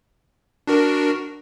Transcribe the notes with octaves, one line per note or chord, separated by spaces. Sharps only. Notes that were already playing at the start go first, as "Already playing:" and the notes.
D4 F#4 A#4